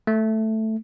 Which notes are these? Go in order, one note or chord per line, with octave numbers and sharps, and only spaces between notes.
A3